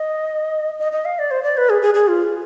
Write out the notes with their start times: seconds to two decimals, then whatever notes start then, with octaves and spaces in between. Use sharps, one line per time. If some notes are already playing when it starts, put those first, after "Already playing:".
Already playing: D#5
0.80 D#5
0.92 D#5
1.05 F5
1.19 D5
1.31 C5
1.43 D5
1.57 B4
1.70 G#4
1.82 G#4
1.94 G#4
2.08 F4